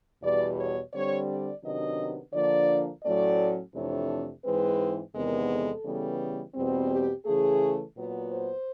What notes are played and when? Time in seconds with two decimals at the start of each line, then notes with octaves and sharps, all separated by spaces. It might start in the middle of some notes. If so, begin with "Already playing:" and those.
0.22 E2 B2 G3 D5
0.58 C#5
0.93 D3 G3 C4 C#5
1.28 D5
1.63 C3 D#3 F#3 B3 D4 D#5
2.33 D3 F3 A#3 D4 D5
3.03 A2 F#3 A3 C#4 D5
3.74 F2 C3 E3 A3 D4 C#5
4.44 G#2 E3 G#3 C4 B4
5.14 E2 C3 D#3 G#3 B3 A#4
5.49 A4
5.84 C#3 E3 G3 B3
6.54 E2 B2 G3 C4
6.89 G4
7.24 C#3 E3 A3 G#4
7.95 A#2 F#3 B3
8.30 C5